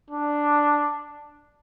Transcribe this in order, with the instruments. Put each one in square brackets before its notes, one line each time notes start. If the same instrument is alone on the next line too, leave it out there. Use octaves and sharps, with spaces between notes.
[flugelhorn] D4